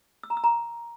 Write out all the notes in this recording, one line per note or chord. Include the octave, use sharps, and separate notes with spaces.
E6
A#5
E6
A#5